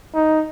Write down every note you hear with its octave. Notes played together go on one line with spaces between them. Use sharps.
D#4